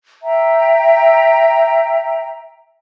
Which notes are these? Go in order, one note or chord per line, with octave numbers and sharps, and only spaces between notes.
E5 G5 A#5